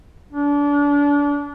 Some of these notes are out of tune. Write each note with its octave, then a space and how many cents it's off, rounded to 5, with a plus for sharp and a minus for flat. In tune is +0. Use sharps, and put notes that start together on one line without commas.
D4 -30